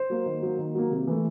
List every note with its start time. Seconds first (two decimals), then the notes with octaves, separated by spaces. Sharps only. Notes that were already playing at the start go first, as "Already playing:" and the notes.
Already playing: C5
0.10 F#3 A#3
0.26 D#3
0.42 F#3 A#3
0.59 D#3
0.75 F#3 A#3
0.91 C3
1.07 E3 A3